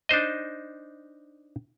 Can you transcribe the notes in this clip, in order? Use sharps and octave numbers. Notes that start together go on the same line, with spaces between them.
D4 D#4 C5 D#5